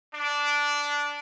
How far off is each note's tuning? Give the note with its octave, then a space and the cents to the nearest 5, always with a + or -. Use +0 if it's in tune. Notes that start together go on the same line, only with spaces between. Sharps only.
D4 -10